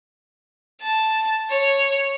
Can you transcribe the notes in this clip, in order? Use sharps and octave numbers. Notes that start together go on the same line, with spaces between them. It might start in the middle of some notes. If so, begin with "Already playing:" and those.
A5
C#5